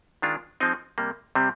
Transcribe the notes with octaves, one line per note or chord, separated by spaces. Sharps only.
D#3 G#3 D4 F4
F3 G#3 C4 D#4
C3 G3 A#3
C3 G3 C4